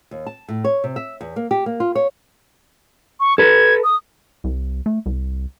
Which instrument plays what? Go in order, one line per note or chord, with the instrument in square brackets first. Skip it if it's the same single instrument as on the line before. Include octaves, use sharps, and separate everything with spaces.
[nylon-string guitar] D#2
A5
A2
C#5
C3
E5
E2
A#3
G4
A#3
F4
C#5
[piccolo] C#6
[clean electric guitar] A4 B4 [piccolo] G#6
[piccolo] D#6
[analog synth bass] C2
A3
C2